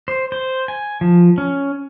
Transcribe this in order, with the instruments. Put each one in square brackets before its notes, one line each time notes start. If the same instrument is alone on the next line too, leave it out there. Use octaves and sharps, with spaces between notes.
[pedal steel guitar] C5
C5
G#5
F3
C#4